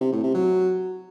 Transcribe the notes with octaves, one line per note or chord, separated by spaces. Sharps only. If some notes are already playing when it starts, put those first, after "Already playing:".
C3
A2
C3
F#3